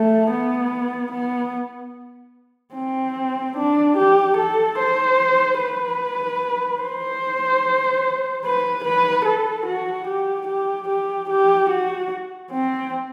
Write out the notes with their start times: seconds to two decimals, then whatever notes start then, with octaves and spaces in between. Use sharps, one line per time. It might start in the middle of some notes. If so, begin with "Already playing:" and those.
Already playing: A3
0.31 B3
1.12 B3
2.74 C4
3.57 D4
3.97 G4
4.37 A4
4.78 C5
5.59 B4
6.82 C5
8.45 B4
8.84 B4
9.25 A4
9.66 F#4
10.08 G4
10.47 G4
10.89 G4
11.30 G4
11.69 F#4
12.51 C4